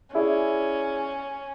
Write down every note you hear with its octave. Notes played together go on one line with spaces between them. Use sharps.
C#4 E4 G#4 D5